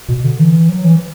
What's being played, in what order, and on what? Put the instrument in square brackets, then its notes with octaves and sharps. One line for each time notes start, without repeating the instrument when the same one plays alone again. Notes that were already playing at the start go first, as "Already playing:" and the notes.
[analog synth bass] B2
D3
E3
F#3
E3